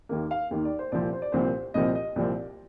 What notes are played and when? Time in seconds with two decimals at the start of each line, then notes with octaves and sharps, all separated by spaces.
0.09 D#2 D#3 A#3
0.31 F5
0.51 D#2 D#3 A#3
0.65 D5
0.79 C5
0.92 C2 A#2 F3 C4 D5
1.13 C5
1.22 D5
1.32 C2 A#2 F3 C4 C5
1.74 C2 A#2 F3 C4 D#5
1.95 D#5
2.16 C2 A#2 F3 C4 D5